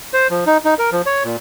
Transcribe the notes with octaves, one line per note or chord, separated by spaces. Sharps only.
C5
F3
D#4
D#4
A#4
F3
C#5
A#2